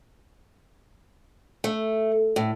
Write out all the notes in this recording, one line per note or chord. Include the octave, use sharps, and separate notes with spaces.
A3
A2